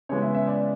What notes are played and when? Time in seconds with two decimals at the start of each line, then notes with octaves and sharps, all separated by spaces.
0.09 C#3 E3 G#3 B3 C#5
0.22 E5
0.34 E5
0.47 D5